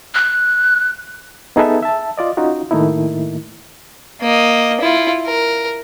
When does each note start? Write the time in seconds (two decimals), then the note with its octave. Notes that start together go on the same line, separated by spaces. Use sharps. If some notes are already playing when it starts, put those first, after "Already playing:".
0.14 F#6
1.56 B3 D#4 G#4 A4 B4 E5
1.82 E5 A5
2.18 F4 D5 D#5
2.37 C#4 D#4 F4 F#4
2.71 A2 D#3 A3 A#3 D#4 E4
4.22 A#3 D#5
4.81 E4 F4
5.26 A#4